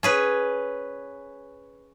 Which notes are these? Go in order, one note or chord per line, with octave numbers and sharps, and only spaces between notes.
C#4 G#4 B4